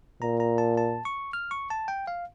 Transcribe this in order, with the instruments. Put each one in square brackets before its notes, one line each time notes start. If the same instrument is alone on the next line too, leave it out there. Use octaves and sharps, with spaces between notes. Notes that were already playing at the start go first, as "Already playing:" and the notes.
[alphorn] A#2 [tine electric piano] A#5
[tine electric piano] A#5
A5
A5
C#6
F6
C#6
A5
G5
F5